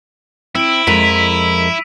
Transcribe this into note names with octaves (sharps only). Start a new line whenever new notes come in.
C4 E4 E6 D7
F2 G#3 A#4 B6 D#7 F7